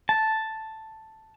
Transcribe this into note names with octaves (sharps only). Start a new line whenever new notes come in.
A5